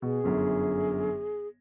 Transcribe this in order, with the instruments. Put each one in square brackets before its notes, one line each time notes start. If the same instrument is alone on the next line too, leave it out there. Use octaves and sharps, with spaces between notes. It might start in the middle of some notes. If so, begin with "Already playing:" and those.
[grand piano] B2 [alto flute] G#4
[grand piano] G1 F#2 D3